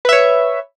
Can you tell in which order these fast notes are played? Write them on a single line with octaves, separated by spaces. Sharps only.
B4 E5 C#5